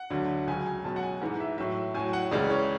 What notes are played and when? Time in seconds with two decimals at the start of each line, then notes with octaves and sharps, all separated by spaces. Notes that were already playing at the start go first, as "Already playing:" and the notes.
Already playing: F#5
0.10 D2 D3 F#3
0.47 C#2 C#3 F#3 G#5
0.66 G#5
0.84 C#2 B2 F#3 A5
0.96 F#5
1.03 G#5
1.21 G#2 E3 G#3
1.40 E5
1.58 A2 F#3 E5
1.94 A2 F#3 G#5
2.13 F#5
2.31 C#2 C#3 E3 G#3 D5
2.50 C#5